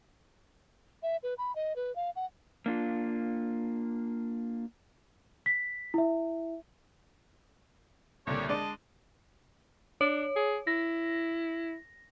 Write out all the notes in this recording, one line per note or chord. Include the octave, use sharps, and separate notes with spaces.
E5
B4
B5
D#5
B4
F5
F#5
A#3 D4 F4
B6
E4 E5
C2 A#2 D3 G3 D4 C#5
G#3 D4 D5 D#5 A5
D4 C#5
G#4
E4 A#6